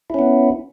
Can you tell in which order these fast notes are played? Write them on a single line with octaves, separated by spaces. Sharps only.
E4 C#4 B3